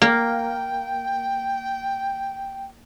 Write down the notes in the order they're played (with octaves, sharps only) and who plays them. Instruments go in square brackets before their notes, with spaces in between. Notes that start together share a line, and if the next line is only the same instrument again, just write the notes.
[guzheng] A#3 [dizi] G5